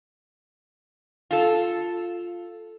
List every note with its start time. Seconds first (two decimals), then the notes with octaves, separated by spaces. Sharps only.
1.31 F4 A4